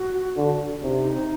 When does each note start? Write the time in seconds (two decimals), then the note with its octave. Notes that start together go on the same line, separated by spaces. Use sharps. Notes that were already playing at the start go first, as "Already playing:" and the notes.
Already playing: F#4
0.36 D3
0.83 C3 D#4
0.91 D4
1.00 D#4